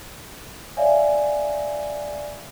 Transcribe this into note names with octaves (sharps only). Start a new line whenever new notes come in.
C#5 D5 E5 F5 G#5